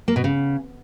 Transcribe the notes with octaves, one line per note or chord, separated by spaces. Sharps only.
A#3
B2
C#3